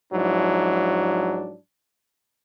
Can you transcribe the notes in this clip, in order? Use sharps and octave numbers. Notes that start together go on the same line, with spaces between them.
G#2 F3 F#3 D4 E4